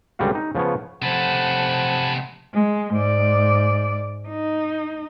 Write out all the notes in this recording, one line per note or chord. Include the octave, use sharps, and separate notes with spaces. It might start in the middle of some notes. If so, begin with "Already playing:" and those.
C#2 D3 G3 F4 F#4 F5
D#4
C#3 F3 B3 C#5
C3 F3 A3 F#5 G#5 A5 B5
G#3
G#2 D5
D#4